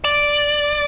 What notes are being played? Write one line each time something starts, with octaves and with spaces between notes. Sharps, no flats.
D5